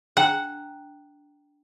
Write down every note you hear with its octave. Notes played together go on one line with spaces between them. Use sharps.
D4 F#5 G5 A#5